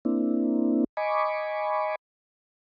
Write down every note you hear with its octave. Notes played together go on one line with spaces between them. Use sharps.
A#3 C4 D4 E4
D#5 G#5 B5 C#6 D6